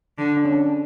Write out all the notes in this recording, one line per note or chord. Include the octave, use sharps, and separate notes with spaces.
D3
D4
C#4
D4